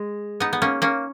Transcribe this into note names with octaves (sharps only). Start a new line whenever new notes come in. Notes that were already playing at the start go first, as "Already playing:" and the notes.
Already playing: G#3
B3 D#4
B3
A#3 C#4
A#3 C#4